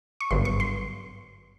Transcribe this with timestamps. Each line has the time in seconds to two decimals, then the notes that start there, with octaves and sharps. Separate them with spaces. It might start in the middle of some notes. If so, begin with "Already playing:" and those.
0.21 C#6
0.31 G#1 G2 D3 F#3 B3 C6
0.45 C#6
0.60 C6